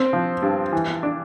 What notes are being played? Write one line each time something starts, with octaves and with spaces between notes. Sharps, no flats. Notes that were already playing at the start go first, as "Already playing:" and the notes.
Already playing: C4
F3
G2
E3
D4